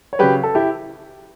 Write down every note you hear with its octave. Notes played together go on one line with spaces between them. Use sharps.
C#5
C#3 F#3 G4 B4
A4
E4 G4